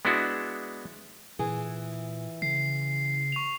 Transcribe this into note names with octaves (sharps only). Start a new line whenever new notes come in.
G#3 B3 D4 E4 F#4
A#2 E3 G#4
C#3 C7
C#6 F7